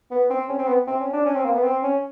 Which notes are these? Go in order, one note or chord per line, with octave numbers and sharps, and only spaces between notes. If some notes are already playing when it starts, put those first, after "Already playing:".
B3
C4
C#4
C4
B3
C4
C#4
D4
C#4
C4
A#3
B3
C4
C#4